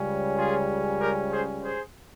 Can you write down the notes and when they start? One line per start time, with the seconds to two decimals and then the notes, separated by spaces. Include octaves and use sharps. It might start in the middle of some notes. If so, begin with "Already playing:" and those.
Already playing: C#2 C#3 G3 C#4
0.37 F4 G#4
0.99 G4 A#4
1.31 G#4 C5
1.63 G#4 C5